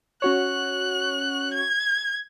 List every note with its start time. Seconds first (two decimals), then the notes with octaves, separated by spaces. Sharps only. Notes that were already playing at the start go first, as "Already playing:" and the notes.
0.22 C#4 F#4 C#5 F#6
1.54 G#6